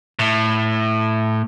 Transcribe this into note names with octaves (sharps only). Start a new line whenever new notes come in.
A2